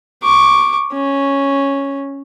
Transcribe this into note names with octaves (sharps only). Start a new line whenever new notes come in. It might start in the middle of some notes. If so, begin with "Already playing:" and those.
C#6 D6
C#4